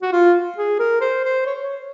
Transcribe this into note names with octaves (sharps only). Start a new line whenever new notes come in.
F#4
F4
G#4
A#4
C5
C5
C#5
C#5